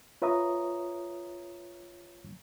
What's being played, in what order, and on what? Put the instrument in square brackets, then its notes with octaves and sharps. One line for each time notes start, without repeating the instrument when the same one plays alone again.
[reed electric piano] F4 B4 C#5 E5 A#5 D#6